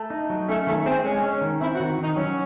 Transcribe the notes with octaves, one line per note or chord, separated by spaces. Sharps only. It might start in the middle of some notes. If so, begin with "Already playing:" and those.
Already playing: A3
D#4
F#3
A3 C#4
D#3 A3
C4 G#4
G#3 C#4
C#4
D#3
C4 E4
F#4
D#3
D#3 D#4
F#3 C#4